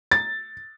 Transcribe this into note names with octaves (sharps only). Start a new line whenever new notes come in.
A6